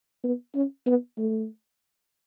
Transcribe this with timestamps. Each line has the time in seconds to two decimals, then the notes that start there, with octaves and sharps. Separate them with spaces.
0.24 B3
0.55 C#4
0.86 B3
1.18 A3